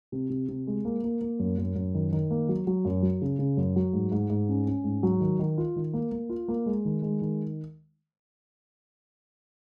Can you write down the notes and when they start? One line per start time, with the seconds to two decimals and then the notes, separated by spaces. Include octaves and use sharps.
0.12 C3
0.30 C3
0.48 C3
0.67 G#3
0.85 A#3
1.04 A#3
1.21 A#3
1.39 F#2
1.58 F#2
1.76 F#2
1.95 D#3
2.12 D#3
2.31 A#3
2.49 F#3
2.67 F#3
2.85 F#2
3.02 F#3
3.22 C#3
3.39 C#3
3.57 F#2
3.76 F#3
3.93 G#2
4.12 G#2
4.30 G#2
4.49 C#4
4.67 C#4
4.84 G#2
5.03 F#3
5.20 D#3
5.39 D#3
5.58 F4
5.76 D#3
5.93 A#3
6.12 A#3
6.30 F4
6.48 A#3
6.66 G#3
6.85 D#3
7.02 G#3
7.22 D#3